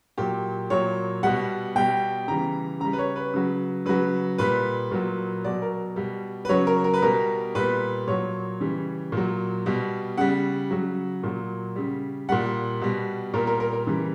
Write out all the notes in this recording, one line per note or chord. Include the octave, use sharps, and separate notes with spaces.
A#2 F#3 G4
A#2 F#3 C#5
B2 G3 F#5
B2 G3 G5
C#3 E3 G3 A#5
C#3 G3 A#5
B4
C#5
B4
C#3 F#3
C#3 F#3 B4
A#2 G3 B4
A#2 F#3
B2 F#3 D5
A#4
B2 G3
B4
C#3 F#3 C#5
A#4
A#4
B4
B2 G3 A#4
A#2 G3 B4
A#2 F#3 C#5
C#3 E3 G3
A#2 F#3
B2 G3
C#3 G3 F#5
C#3 F#3
A#2 F#3
C#3 G3
A#2 G3 F#5
B2 G3
A#2 G3 A#4
A#4
A#4
A#4
C#3 E3 G3